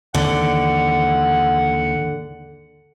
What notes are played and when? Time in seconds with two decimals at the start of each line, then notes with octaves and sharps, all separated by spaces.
0.14 D#2 G#2 D3 E3 F#5